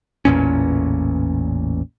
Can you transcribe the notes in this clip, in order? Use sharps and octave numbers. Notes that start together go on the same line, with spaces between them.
A1 E2 A#2 C#4